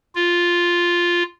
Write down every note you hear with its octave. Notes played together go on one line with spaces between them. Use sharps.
F4